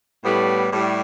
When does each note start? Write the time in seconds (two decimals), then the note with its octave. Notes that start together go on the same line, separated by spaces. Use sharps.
0.24 A2 G3 B3
0.71 A2 G3